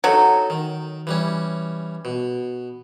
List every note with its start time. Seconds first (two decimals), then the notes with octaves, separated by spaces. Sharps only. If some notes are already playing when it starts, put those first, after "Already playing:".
0.04 F#3 D#4 A4
0.50 D#3
1.07 E3 G3 C#4
2.05 B2